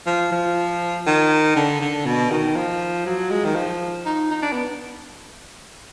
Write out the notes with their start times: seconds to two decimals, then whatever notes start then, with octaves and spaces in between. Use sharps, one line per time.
0.06 F3
0.32 F3
1.07 D#3
1.56 D3
1.81 D3
2.06 B2
2.31 D#3
2.56 F3
3.06 F#3
3.31 G#3
3.45 D#3
3.56 F3
4.06 D#4
4.31 D#4
4.42 D4
4.52 B3